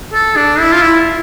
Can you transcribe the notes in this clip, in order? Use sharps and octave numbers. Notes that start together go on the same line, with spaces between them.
A4
D4
E4
F4
E4